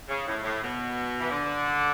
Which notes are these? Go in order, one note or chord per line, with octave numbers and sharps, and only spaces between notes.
C#3
A2
A2
B2
E3
D3